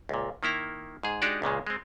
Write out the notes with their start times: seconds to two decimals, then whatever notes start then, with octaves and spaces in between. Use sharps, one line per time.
0.09 C#2 A#2
0.43 D#3 A#3 E4 A#5
1.03 G#2 G#4
1.22 G#3 D4 D#4 F#4 G4 D5
1.42 C#2 A#2 C#3 G#3
1.67 G#3 C4